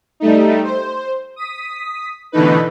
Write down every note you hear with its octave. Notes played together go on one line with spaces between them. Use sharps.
G3 A3 D#4
C5
D#6 B6
B2 D3 E3 A3 D#4 B4